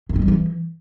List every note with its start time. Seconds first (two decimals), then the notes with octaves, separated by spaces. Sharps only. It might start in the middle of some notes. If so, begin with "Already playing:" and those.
0.09 D#3
0.16 G#3
0.22 G3
0.28 E3